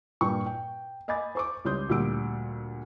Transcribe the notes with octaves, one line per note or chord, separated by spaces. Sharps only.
G2 A#2 G5 C#6
G5
D#5 G#5 B5 D6 A6
C5 C#6 D6
C#2 G3 C#5 C6 D#6 G6
D2 A#2 G3 E6 D7